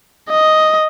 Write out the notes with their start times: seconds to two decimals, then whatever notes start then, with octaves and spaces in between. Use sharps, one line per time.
0.30 D#5